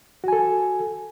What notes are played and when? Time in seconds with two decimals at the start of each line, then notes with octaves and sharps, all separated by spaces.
0.24 F#4
0.28 G#5
0.33 A4